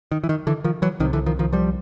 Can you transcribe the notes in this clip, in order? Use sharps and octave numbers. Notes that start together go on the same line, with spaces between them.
D#3
E3
D#3
D3 E3
D#3 F3
E3 F#3
C2 C3 D#3
D3 E3
D#3 F3
D#3 F3
F3 G3